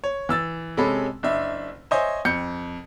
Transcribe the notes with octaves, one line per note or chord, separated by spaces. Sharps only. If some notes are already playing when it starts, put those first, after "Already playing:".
C#5
E3 E6 A6
C3 G#3 C#4 A4 B5
F#1 D4 E5
C5 C#5 D#5 E5 G#5
F2 G6 C#7